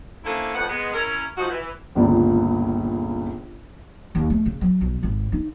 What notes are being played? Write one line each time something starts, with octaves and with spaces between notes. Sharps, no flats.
D3 A#3 C4 C#4 E4 A4
F2 A2 B3 F#5
G#3 B3
C#4 E4 A#4
F3 D#4 F#4
E3
G1 C#2 A#2 D5
D#2
A3
C#3
F#3
B1
G#1
D#4